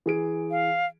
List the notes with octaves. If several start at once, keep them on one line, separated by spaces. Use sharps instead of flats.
E3 G#4 D7
F5